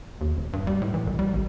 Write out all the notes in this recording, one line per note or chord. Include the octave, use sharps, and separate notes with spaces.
D#2
D#1
G2
G3
A2
E3
C2
G3
A1